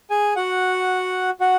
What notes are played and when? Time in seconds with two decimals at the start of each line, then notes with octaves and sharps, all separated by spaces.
0.10 G#4 G#5
0.36 F#4 F#5
1.40 F#4 F#5